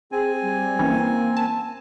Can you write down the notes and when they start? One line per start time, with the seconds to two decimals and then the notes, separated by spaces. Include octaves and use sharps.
0.12 C4 G#4 G#5
0.42 G3
0.79 G#1 E3 A#3 C#4
1.37 A5